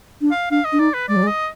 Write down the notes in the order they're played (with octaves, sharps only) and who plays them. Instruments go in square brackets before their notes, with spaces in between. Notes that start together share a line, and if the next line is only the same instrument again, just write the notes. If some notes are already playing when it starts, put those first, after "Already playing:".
[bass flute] D4
[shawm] F5
[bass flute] D4 [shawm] F5
[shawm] D#5
[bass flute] D4
[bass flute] D#4 [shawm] D5
[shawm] B4
[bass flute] G#3 [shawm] D5
[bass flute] F#3
G#3
[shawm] D#5